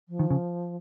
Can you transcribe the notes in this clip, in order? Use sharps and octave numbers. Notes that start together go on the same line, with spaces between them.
F3
D#3
C#3